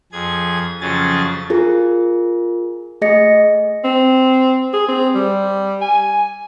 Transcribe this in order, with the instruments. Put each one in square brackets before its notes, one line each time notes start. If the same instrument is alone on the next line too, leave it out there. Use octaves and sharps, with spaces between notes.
[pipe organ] F2 G#4 G#6
F2 C#3 F#3 C#4 G#4 A6
[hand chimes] F4 G#4 A#4
A3 G#4 D#5 A#6 C#7
[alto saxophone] C4
G#4
C4
G3
G#5